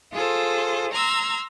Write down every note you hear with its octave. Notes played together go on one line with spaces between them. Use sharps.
F4 G#4 A4 C5
A#5 C6 E6 F6 G#6